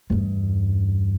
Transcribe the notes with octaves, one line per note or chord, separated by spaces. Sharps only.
E2 G2